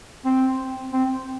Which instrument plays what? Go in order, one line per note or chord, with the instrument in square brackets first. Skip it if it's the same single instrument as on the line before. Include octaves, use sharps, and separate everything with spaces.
[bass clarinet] C4
C4